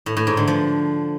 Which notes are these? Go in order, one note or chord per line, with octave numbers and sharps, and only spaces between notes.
A2
A2
G#2
D3
F3